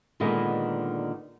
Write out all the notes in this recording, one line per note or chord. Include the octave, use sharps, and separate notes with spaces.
A#2 D3 D#3 G#3 B3